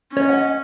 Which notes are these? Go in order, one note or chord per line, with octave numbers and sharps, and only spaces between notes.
C#4 C#5
D#5
F#5
D#5